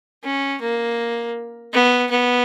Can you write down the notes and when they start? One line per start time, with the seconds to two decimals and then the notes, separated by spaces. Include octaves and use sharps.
0.24 C#4
0.62 A#3
1.73 B3
2.11 B3